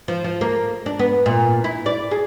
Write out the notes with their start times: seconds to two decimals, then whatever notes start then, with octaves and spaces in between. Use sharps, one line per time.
0.08 F3
0.24 F3
0.41 A#3
0.86 D4
0.99 B3
1.26 A#2
1.64 E4
1.86 D5
2.11 G#4